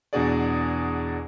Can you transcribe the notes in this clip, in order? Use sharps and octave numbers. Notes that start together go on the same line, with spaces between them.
E2 B2 D4 F#4 G#4 D5